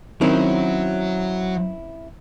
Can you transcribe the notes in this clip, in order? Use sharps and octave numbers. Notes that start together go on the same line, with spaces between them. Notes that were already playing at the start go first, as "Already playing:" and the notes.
D#3 F#3 C4 C#4 E4